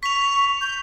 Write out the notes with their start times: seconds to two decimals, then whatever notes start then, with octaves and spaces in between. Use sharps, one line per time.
0.03 C#6 B6 F7
0.61 G6